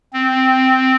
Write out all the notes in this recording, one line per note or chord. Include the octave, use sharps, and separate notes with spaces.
C4